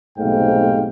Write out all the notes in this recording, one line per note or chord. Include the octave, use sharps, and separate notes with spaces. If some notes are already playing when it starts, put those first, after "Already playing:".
B1 G#2 C3 A3 F5 G5